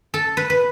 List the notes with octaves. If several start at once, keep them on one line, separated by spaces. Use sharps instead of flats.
A4
B4
B4